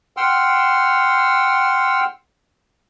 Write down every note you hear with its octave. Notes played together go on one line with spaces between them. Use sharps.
F#5 G5 C6 E6 F6